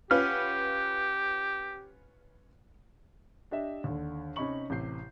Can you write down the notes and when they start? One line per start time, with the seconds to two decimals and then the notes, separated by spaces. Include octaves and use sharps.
0.11 C#4 F4 G4 B4 F#5 F6
3.51 D4 G4 D#5 E5
3.84 D#2 D3
4.36 C3 C#4 D#4 B5 C#6 F#7
4.70 A1 C3 G6 C7